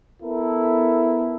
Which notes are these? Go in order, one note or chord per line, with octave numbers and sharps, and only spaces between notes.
B3 E4 A4 A#4